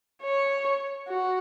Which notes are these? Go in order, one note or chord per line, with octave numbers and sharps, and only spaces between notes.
C#5
F#4